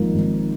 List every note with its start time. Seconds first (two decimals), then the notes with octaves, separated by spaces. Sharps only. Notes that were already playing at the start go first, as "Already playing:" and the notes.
Already playing: G#1 G#2 F3 A#3
0.14 G#1